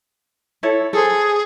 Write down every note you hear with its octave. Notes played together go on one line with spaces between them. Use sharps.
E4 A4 C#5
G#4 A4 C5